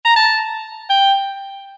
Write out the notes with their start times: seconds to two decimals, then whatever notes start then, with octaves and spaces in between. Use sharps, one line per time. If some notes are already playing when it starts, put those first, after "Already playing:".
0.05 A#5
0.16 A5
0.90 G5